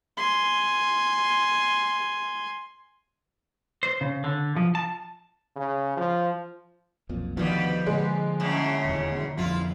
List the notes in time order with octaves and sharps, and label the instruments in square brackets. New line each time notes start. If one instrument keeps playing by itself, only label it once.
[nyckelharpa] G#5 C6
[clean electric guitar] C5
C#3
D3
F3
A5
[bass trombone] C#3
F3
[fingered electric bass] B1 F2 A#2
[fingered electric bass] D2 D#3 B3 [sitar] B2 G3 [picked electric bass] F3
[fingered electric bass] A#2 D3 [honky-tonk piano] G#3
[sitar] F#2 A2 C#3
[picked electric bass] D#1 E2
[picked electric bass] A1 F2 F3 [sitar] E4 F4